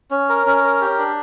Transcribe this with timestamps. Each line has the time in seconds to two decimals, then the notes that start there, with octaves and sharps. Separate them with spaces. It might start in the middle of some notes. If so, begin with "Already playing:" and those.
0.11 C#4
0.29 A#4
0.46 C#4
0.64 A#4
0.81 G4
0.98 D4